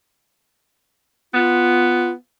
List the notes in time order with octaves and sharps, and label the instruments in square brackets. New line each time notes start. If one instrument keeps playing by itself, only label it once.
[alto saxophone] B3 [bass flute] F4